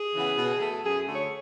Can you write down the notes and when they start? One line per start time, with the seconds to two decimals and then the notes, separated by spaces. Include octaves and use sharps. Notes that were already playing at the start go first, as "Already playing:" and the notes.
Already playing: G#4
0.14 C#3 E3 B3
0.38 B2
0.60 A3
0.83 F#2 G#4
1.06 D3 A3
1.14 C#5